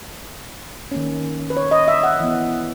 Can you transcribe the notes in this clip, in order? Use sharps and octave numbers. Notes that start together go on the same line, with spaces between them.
D#3 A#3 C#4
B4
C#5
D#5
E5
F#5
E3 B3